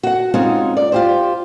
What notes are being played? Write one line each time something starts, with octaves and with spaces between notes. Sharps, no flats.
F#4 F#5
G#3 C4 C#4 D#4 F4
D5
F4 G4 C5